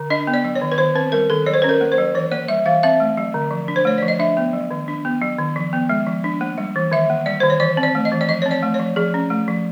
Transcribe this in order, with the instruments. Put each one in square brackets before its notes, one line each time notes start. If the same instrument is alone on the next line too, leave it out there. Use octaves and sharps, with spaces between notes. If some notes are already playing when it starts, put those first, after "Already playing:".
Already playing: [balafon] D3
D4 D#5
B3
D5
F#3
C#5
D#3
B4
D#3 C5
C4 B4
G3 A#4
D#3 A4
F#3 C#5
C5
C#4 B4
A#4
A#3
C5
F#3
E3 C#5
A#3 D5
G3 E5
E3 F5
C4 E5
A3
F#3
D3
F3
D4
C5
A3 C#5
F3 D5
D#5
D4 E5
B3
F#3
D#3
D4
B3
F#3
D#3
F3
B3
G#3
F3
D4
A#3
G3
E3
D#3 E5
A#3
G3 D5
D#3 C5
C#5
E3 D5
C4
D5
A3
D#5
E3
D5
F3 D#5
C4 C#5
D5
A3
C#5
F3
F3 G#4
C#4
A3
F3